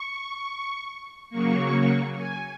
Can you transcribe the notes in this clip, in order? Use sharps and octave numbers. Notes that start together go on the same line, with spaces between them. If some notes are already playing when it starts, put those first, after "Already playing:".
Already playing: C#6
C#3 F#3 A#3 C#6
G#5